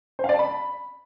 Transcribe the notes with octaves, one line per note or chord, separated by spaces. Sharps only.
C5
F5
D5
A5
B5